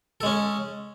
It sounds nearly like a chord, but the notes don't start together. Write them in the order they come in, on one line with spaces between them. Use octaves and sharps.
A4 G#3 C#4